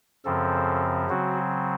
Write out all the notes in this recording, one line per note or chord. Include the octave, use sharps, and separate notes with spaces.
F#2 C#3 F3 C4 A4
C#3 F#3 C4 F#4